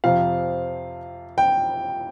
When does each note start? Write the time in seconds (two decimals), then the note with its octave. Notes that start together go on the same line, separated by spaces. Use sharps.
0.04 F2 C3 F3 F5
1.38 G5